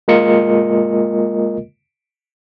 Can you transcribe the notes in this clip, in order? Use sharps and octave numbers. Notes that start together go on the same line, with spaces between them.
G#3 A#3 F4 A#4 D#5 C#7